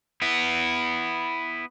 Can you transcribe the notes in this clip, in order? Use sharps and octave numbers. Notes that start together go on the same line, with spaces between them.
B3 E4